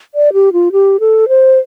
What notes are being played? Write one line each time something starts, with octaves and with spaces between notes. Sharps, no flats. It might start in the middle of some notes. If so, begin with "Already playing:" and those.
D5
G4
F4
G4
A4
C5